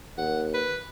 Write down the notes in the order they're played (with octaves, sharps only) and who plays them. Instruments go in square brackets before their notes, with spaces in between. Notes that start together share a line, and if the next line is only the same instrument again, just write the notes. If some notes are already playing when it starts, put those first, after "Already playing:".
[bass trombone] D#2 [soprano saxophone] F#5
[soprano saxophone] B4